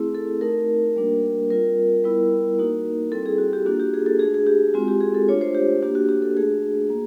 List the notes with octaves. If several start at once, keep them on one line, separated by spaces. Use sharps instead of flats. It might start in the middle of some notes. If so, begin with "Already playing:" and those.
Already playing: A3 C4 E4 G#4
A4
A3 C4 D#4 F#4 A#4
G3 A#3 D4 F#4
G3 C4 F4 A#4
G3 B3 E4
A#3 D#4 F#4
G3 C4 E4 A4
G#4
F#4
G4
A#3 D4 F4 F#4
G4
G#4
A4
A3 D4 F#4 G#4
G#4
G4
G#3 C4 F4 F#4
G4
G#4
A4
A3 D4 F4 C#5
C5
G4
A#3 D4 F#4 G4
F#4
G4
A4
A3 D4 F#4 G#4
A#3